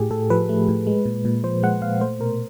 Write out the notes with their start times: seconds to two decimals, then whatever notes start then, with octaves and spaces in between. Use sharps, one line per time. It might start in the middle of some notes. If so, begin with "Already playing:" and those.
Already playing: A2 A3 G4 G#4
0.11 A2 A4
0.30 F3 B4
0.49 A3
0.68 A2
0.87 G#3
1.05 A#2
1.25 A#2
1.44 F3 C5
1.63 G#3 F#5
1.82 A#2 F5
2.01 A3 C5
2.20 B2 A#4